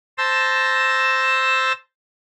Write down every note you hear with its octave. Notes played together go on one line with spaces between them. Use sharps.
C5 A5 E6 A#6